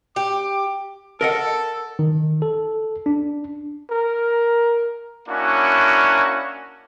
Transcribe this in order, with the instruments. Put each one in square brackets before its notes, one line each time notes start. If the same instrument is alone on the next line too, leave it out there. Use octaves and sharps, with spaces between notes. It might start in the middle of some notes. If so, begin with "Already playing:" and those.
[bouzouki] G4 [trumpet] D6
[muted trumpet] A4 [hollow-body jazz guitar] A#4 D#5 F#5
[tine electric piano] D#3
A4
D4
[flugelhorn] A#4
[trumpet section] A#3 C#4 D4 E4 F#4